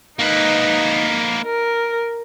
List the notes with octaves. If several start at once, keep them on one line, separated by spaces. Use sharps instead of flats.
A#3 D#4 B4
A#4